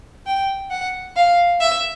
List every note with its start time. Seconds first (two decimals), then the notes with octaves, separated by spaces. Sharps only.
0.26 G5
0.71 F#5
1.16 F5
1.61 E5